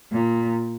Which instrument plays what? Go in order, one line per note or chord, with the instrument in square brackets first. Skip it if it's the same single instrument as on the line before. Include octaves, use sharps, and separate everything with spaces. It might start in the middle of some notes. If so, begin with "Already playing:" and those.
[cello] A#2